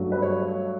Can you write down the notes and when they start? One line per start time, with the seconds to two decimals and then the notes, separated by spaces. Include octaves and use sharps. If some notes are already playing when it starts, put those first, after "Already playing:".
Already playing: G2 F#3 A3
0.12 B4
0.22 C#5